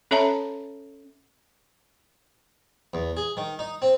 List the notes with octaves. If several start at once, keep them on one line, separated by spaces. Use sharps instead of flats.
C#4 A4 C#5 E5 A5 A#5
E2
G#4
D#3
D#4
C4